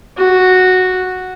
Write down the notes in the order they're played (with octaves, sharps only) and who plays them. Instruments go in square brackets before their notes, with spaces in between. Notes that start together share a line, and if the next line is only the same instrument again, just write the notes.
[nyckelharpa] F#4